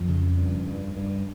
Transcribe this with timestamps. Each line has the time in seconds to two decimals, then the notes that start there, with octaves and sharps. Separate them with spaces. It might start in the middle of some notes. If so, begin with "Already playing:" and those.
Already playing: F2 F3
0.08 C#3
0.37 G2
0.67 G2
0.97 G2